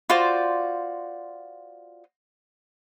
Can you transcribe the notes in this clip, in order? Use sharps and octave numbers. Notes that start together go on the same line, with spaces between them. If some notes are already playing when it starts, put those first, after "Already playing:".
F4 F#4 C5 D5